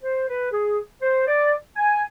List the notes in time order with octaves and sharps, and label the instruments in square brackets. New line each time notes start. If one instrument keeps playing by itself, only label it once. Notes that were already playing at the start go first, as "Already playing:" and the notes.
[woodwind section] C5
B4
G#4
C5
D5
G#5